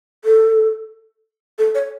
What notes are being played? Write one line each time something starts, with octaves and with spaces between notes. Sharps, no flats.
A4
A4
C#5